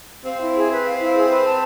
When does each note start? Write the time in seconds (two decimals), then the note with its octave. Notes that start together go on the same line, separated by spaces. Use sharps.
0.25 C4 F5
0.41 E4
0.55 G#4
0.70 B4
0.84 F5
1.00 E4
1.14 G#4
1.29 B4
1.45 A5